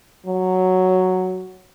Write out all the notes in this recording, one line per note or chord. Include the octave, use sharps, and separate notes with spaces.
F#3